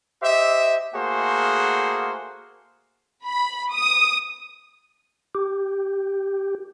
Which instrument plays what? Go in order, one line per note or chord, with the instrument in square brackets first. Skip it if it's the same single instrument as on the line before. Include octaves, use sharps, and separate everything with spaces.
[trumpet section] G4 C5 D#5 E5
A3 A#3 F#4 G#4 C5
[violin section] B5
D#6
[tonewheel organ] G4